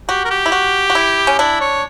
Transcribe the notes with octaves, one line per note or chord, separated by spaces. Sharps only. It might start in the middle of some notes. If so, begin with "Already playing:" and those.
F#4 G4
A#4
G4
E4
F#4
F#4
E4
C#4
D4 E4
C#5